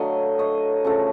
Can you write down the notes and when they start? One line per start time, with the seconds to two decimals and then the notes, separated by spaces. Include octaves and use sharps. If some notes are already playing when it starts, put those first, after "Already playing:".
Already playing: D3 F#3 A3 D#5 F5
0.39 C#5 D#5
0.85 C#3 F3 A3